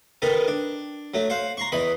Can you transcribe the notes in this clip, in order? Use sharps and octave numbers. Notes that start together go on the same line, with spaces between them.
D#3 B3 D#4 A4 B4
D4
F#3 A3
C5 F5 F#5
A#5 C6 C#6
E2 E3 D#5 B5